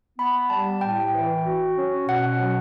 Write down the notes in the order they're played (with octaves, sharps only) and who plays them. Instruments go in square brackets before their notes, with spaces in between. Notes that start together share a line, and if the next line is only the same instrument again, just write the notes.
[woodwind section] B3 [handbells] B5
[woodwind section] G3 [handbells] A5
[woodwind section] A2 [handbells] G5
[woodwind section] E3
F#4
C#4
[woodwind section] B2 [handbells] F#5
[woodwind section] F#3